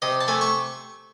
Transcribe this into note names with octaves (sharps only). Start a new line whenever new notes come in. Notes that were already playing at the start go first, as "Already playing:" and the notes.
C3 D#5
A5
A3 G#5
C#6